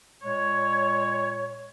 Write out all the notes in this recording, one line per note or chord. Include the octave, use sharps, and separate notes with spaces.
A#2 G#3 C#5